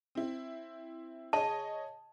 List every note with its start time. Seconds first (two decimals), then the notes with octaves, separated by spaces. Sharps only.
0.15 C4 E4
1.33 G#4 C#5 D#5 A5